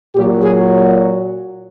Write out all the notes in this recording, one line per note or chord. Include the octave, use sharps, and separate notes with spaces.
A#2 F#3 G4
G#4